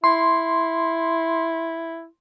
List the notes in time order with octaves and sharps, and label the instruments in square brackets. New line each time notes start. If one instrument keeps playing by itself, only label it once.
[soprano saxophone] E4 [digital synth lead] C6